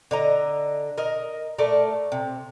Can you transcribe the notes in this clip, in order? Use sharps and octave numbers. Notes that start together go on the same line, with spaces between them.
D3 D#5 A#5
A#4 D#5
A3 A4 A#4 D5
C3